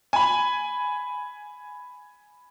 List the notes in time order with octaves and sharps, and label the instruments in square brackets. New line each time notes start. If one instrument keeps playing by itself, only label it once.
[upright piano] G#5 B5